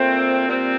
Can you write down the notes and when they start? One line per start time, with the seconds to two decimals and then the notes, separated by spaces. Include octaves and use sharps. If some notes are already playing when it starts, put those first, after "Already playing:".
Already playing: A#2 A3 C4
0.48 A#2 G3 C4